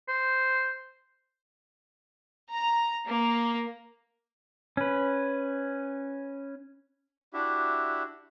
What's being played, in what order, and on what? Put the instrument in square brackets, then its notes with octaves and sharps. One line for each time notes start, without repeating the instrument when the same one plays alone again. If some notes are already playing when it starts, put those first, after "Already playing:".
[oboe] C5
[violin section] A#5
A#3
[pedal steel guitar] C#4 B4
[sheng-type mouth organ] D4 E4 F#4 G4 E5